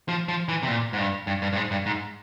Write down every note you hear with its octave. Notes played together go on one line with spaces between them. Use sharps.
F3
F3
E3
C3
A#2
G#2
G2
G2
G2
G2
G#2
G2
G#2